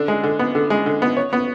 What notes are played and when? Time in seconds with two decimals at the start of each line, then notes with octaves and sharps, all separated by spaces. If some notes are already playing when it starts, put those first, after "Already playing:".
Already playing: D3 D4
0.08 G#3
0.24 D3
0.39 B3
0.55 D3
0.70 G#3
0.86 D3
1.02 B3
1.17 C#5
1.33 B3